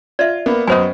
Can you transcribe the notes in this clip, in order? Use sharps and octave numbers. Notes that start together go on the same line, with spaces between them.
F4 D5 E5
A#3 B3
F#2 B3 C#4 C5 D#5 G#5